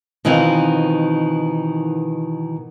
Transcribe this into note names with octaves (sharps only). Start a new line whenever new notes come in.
B2 D#3 E3 C4 D#4 F4